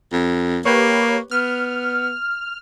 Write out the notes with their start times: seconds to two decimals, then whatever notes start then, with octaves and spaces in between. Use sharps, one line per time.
0.12 F2
0.65 A#3 G4 B4 C#5
1.31 B3 F6